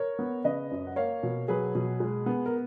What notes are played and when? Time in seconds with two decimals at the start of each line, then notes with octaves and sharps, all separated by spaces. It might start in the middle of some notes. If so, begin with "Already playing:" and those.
Already playing: A#4 C#5
0.19 B3
0.44 C#3 B4 D#5
0.71 F#2
0.87 F#5
0.96 A#3 C#5 F5
1.23 B2
1.48 F#3 G#4 B4
1.75 B2
2.00 G#3
2.26 B3
2.46 A#4